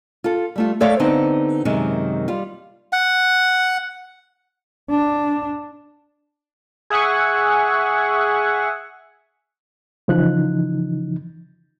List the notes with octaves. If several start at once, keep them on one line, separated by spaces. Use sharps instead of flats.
F4 A4
G3 A3 F4
A3 A4 C#5 D5 E5 F5
D3 B3 C4 D#4
F#2 C3 D#3 G#3
G3 F4
F#5
D4
G#4 E5 F#5 G#5 C#6
C#3 E3 F3 D#4 F#6